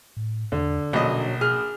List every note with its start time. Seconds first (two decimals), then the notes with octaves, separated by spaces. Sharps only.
0.17 A2
0.52 E2 D3
0.93 A#1 B2 F#3 C#4 D#5
1.41 G#4 F6